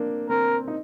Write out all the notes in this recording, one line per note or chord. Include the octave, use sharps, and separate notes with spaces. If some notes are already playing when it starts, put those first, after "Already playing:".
Already playing: A#3 C4 D4
C4 A#4
D#4